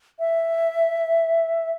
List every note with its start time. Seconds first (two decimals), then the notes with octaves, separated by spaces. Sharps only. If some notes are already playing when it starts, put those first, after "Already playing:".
0.19 E5